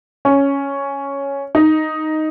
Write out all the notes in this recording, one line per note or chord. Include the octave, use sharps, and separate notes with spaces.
C#4
D#4